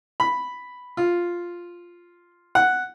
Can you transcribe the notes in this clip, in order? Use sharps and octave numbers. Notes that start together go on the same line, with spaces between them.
B5
F4
F#5